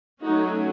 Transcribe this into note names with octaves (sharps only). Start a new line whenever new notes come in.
F#3 A3 C#4 D#4 F#4